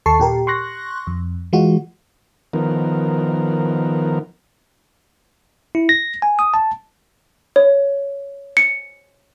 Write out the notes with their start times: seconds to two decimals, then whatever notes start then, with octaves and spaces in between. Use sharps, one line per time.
0.06 D#2 A4 A5 C#6 C7
0.20 A#2 G4 A#4
0.47 C6 C#6 F#6 A#6
1.07 F2
1.53 E3 G#3 F4 F#4
2.53 D#3 F3 B3 A#4
5.75 E4
5.89 A#6
6.22 G#5
6.39 D#6
6.54 A5
7.56 C#5
8.57 C#7